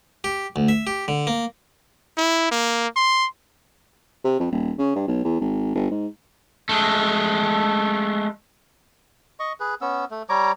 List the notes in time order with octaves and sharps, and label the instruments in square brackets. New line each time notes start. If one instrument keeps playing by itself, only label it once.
[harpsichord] G4
D2
E5
G4
D3
A#3
[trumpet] E4
A#3
C6
[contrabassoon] C3
F2
D#1
C#3
G2
B1
E2
G#1
G1
G#2
[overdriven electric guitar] G#3 A3
[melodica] D#5 C#6
G#4 B4
B3 C#4 E6
A3
G3 C#5 A#5 D6